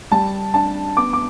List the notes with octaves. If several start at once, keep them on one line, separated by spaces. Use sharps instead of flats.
G3 A5
D4 A5
B3 D6
D6